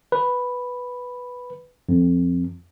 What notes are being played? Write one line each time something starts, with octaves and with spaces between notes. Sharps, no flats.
B4
F2